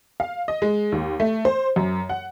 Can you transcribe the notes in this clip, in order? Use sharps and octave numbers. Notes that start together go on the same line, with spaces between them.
F5
D#5
G#3
D#2
A3
C5
F#2
F#5